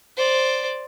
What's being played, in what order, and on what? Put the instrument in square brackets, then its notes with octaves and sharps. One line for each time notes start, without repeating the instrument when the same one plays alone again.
[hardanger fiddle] C5 D5